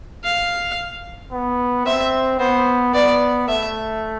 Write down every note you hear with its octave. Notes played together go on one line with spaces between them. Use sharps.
F5
B3
C4 E5
B3 C5
B3 D5
A3 E5